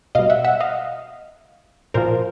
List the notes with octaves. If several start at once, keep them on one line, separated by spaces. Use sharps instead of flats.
B2 G3 D#5 F5
E5 F#5
E5 F#5
D#5 F5
A#2 F3 A#4 C5